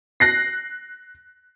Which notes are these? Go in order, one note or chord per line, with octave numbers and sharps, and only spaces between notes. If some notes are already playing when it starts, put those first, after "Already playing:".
F#6 A#6 C7